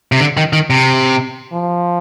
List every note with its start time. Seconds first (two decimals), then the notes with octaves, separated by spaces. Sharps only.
0.12 C3
0.20 D3
0.37 D#3
0.53 D#3
0.70 C3
1.53 F3